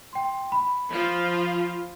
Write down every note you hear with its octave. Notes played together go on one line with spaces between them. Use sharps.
G5 C6
B5
F3 F4